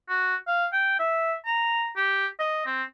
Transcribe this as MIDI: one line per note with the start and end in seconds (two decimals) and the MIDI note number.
0.09 0.35 66
0.47 0.66 77
0.73 0.98 79
0.99 1.34 76
1.46 1.90 82
1.96 2.27 67
2.40 2.63 75
2.66 2.83 60